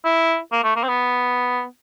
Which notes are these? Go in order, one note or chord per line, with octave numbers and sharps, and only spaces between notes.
E4
A#3
A3
A#3
C4
B3